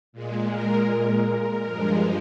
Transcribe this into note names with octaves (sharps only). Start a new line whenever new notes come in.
A#2 G#3
A#4
G2 F3 G#3